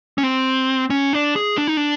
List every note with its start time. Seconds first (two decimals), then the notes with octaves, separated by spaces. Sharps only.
0.18 C#4
0.23 C4
0.90 C#4
1.13 D4
1.36 G#4
1.58 D4
1.67 D#4
1.77 D4